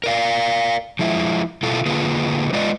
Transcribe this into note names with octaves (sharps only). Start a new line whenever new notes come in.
A#4 D5 F5
F3 G#3 E4
B2 E4 F4 A4
D3 A#3 F4 G#4 B4
G#3 F4 B4 D5 D#5